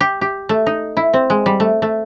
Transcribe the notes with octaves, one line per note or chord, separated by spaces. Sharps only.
G4
G4
A3
D#4
E4
C4
G#3
G3
A3
A3